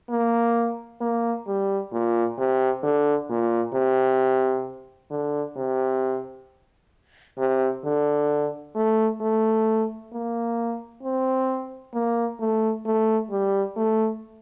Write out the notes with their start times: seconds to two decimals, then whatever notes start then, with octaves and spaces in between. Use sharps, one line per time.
0.10 A#3
1.01 A#3
1.47 G3
1.93 A#2
2.38 C3
2.83 D3
3.30 A#2
3.74 C3
5.11 D3
5.57 C3
7.38 C3
7.85 D3
8.75 A3
9.21 A3
10.13 A#3
11.03 C4
11.94 A#3
12.40 A3
12.86 A3
13.31 G3
13.77 A3